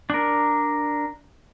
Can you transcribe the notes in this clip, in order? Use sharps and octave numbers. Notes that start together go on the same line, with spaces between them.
D4 A#4